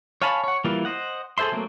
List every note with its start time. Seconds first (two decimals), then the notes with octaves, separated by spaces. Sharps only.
0.22 C#5 F5 G#5 A5 B5
0.44 C#5 F#5
0.64 E3 G3 A#3 F4
0.85 C5 D#5 F#5
1.38 G#4 A4 C5 E5 C6
1.52 F#3 A3 A#3 C4